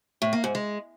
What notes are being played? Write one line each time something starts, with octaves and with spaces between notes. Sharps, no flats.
A2
A#3
G#2
G#3